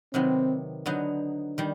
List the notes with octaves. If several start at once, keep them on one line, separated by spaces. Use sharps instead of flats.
C3 D#3 F#3 B3 C4
D3 F#3 B3 D#4
D#3 G3